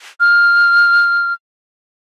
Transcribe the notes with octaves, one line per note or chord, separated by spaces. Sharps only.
F6